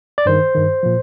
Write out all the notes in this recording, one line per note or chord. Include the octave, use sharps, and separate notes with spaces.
D5
G2 D#3 C5
G2 D#3
A#2 F3